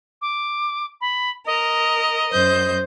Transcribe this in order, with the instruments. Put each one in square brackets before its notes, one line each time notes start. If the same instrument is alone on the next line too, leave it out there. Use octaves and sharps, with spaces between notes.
[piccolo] D6
B5
[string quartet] A#4 [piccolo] D#5
[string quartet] F#2 C5 G6